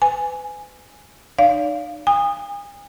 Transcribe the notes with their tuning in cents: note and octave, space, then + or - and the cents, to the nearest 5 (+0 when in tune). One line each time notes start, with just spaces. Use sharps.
B4 +35 G#5 +0
D#4 -40 D5 -40 F5 +0
G#5 -45 D#6 -15